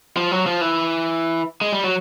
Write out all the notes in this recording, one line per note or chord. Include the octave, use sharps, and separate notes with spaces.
F3
F#3
F3
E3
G#3
G3
F#3